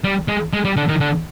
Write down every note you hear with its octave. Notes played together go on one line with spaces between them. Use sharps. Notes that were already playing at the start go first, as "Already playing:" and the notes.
G3
G#3
G#3
G3
D3
D#3
D3